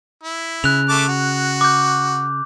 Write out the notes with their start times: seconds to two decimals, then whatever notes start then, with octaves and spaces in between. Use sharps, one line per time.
0.23 E4
0.64 C#3 F#6 F7
0.89 A3 A5 D6
1.08 F#4
1.61 D6 G6